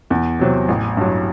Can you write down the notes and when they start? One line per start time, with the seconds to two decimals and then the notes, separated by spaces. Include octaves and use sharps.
0.10 E2
0.39 C3 F#3 C4
0.68 A1
0.97 G2 F#3